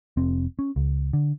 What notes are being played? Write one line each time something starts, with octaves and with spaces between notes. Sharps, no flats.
F1 C4
C#4
C#2
D3